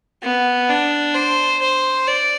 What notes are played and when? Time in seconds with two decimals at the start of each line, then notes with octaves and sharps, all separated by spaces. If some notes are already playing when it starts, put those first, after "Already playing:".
0.23 B3
0.70 D4
1.15 C5
1.62 C5
2.08 D5